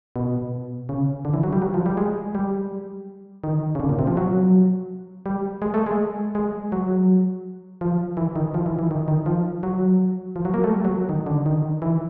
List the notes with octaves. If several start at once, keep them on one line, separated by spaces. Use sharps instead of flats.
B2
C#3
D3
E3
F#3
G3
F#3
F3
G3
G#3
G3
D#3
C#3
D3
A#2
C3
F3
F#3
G3
G#3
A3
G#3
G#3
F#3
F3
E3
D#3
F3
E3
E3
D#3
D#3
F3
F#3
F3
F#3
A#3
A3
G3
F#3
D#3
D3
D#3
E3